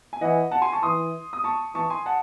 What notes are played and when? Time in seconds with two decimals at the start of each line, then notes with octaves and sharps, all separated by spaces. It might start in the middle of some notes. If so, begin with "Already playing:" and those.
0.13 G#5
0.21 E3 D#5 F#5
0.51 F#5 A5
0.62 G#5 C6
0.72 A5 C#6
0.83 E3 C6 D#6
1.33 D#6
1.44 A5 C#6
1.75 E3 A5 C#6
1.90 G#5 C6
2.06 F#5 A5